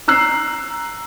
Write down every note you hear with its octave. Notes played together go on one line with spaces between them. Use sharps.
A#5 E6 F#6 C7